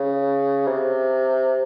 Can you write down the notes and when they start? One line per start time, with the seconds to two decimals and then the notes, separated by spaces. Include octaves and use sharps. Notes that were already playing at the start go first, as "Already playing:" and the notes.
Already playing: C#3
0.67 C3